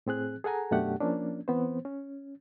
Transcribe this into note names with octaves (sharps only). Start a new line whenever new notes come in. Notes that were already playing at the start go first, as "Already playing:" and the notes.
A2 C4 G#4 F#6
G#4 A4 F#5 G#5 A#5
F#2 B2 A3 D4 G4 F#5
F3 A#3 C#4 D4
E3 B3 C4 C5
C#4